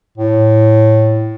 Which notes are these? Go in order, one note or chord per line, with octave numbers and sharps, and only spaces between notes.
A2